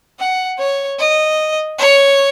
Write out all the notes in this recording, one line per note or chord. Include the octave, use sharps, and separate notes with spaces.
F#5
C#5
D#5
C#5